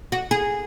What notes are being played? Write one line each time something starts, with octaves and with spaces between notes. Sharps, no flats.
F#4
G#4